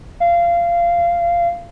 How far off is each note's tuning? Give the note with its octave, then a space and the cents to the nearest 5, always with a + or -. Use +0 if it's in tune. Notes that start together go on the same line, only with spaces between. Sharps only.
F5 -20